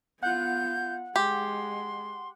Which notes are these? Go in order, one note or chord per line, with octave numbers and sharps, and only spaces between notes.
B3 F4 F#5 G6
G#3 G4 C6